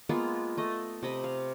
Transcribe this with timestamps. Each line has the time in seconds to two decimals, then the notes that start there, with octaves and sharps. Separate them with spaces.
0.09 G#3 A#3 B3 F4
0.58 A3 D#5
1.03 C3 D#5 B5
1.24 F5